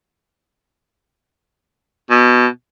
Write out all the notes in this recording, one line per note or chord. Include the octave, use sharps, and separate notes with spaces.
B2